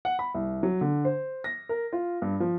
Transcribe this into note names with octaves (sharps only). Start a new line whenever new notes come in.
F#5
B5
C2
F#3
D3
C5
A#6
A#4
F4
G2
F3